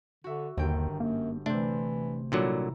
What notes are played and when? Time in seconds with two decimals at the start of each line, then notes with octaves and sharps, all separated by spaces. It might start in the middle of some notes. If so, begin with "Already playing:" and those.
0.24 D3 F#4 E5
0.57 G1 D#2 D#3 G5
1.00 F#2 A#3
1.46 C3 E3 A3 C4 D4
2.32 A#2 D3 F#3 G3 E4 A#5